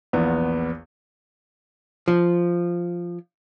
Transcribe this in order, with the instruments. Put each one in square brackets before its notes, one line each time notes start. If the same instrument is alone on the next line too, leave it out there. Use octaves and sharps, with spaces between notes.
[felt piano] A#1 E2 B3
[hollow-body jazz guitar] F3